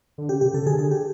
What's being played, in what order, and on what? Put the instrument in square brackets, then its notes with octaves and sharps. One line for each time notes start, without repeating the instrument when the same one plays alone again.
[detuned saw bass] D3
[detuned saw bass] C#3 [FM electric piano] G4
[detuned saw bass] C3 [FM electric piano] G4
[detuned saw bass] C#3 [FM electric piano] A4
[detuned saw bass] D3 [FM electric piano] G#4
[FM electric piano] G#4
G4